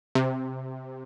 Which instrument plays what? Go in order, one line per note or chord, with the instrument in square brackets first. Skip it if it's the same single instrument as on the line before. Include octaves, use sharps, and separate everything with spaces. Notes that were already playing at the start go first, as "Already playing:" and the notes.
[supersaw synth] C3